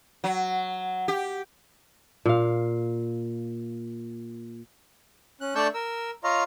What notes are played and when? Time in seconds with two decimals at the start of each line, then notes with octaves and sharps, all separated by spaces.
0.24 F#3
1.08 G4
2.26 A#2 F5
5.41 C#4 F#6
5.55 A3 D4 D5 C#6 E6 G6
5.74 A#4 E6
6.24 F4 C#5 D#5 F5 A#5